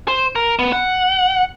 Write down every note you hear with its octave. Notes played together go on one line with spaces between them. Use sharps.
C5
A#4
B3
F#5